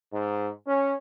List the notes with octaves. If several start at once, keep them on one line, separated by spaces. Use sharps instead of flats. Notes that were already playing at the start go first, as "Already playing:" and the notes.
G#2
C#4